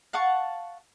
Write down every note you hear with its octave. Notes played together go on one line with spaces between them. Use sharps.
F5 F#5 A5 C#6